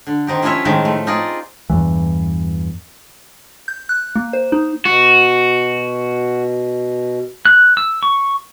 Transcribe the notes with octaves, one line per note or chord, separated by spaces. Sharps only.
D3
D#3 C4 D#4 G4
F3 C#4 E4 F4 C#5 E5
A2 D#3 F3 G#3 C5
A3
C4 D#4 F4 G#4 D5
E2 G2 E3
G6
F#6
A#3
C5
D#4
B2 F#4
F#6
E6
C#6